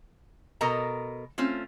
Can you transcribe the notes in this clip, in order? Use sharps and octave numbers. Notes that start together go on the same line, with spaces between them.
B2 A4 A#4 D#5 A#5
A3 C4 C#4 F4